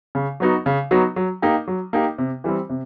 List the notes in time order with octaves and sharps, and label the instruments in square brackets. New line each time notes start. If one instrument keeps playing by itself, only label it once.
[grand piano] C#3
F#3 B3 D#4 F#4
C#3
F#3 B3 D#4 F#4
F#3
A#3 D#4 G4
F#3
A#3 D#4 G4
C3
E3 G3 C4
C3